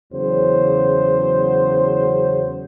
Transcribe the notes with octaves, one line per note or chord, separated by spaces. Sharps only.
E2 C#3 F#3 C5